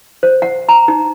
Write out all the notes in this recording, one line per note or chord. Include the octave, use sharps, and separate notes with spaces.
C5
F#5
A#5
D#4